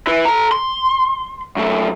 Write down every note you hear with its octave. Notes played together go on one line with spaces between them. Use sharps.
E4 B4
A4 A#5
C6
F#2 A3